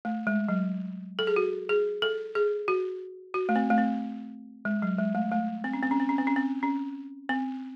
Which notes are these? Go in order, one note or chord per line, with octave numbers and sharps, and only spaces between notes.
A3
G#3
F#3
A4
G#4
F#4
G#4
A4
G#4
F#4
F#4
A3
C4
A3
C4
G#3
F#3
G#3
A3
A3
C4
C#4
C4
C#4
C4
C#4
C4
C#4
C4
C#4
C4